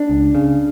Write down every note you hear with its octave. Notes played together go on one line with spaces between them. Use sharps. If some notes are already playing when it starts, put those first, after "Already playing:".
Already playing: D4
C#2
C#3